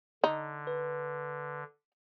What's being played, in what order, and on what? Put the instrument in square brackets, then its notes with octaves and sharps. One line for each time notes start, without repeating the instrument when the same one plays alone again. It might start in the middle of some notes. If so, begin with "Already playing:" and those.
[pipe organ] D3 [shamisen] D#4
[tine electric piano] B4